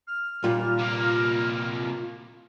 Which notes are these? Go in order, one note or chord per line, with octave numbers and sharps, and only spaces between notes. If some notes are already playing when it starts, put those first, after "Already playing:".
F6
A#2 G3 F4
C3 A#3